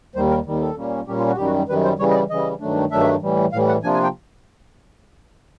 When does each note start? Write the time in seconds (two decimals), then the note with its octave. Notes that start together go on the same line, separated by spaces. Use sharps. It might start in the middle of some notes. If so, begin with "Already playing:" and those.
0.15 D#2 D#3 G3 C5
0.30 A#4
0.46 D#2 D#3 G3
0.61 A4
0.77 A#2 G3 A#3 C#4
1.07 A#2 G3 A#3 C#4 G4
1.18 F4
1.28 F#4
1.37 F#2 D#3 G3 G4
1.45 F#4
1.69 F#2 D#3 G3 B4
1.84 C5
1.99 C#3 E3 G3 C#5
2.10 D#5
2.15 D5
2.30 C#3 E3 G3 D#5
2.60 G2 D#3 F#3 A3 D4
2.91 G2 D#3 F#3 A3 D4 E5
3.22 A2 E3 G3
3.52 A2 E3 G3 F5
3.68 F#5
3.83 C3 F3 A#3 D4 F4 G#5
3.94 G#5
4.03 G5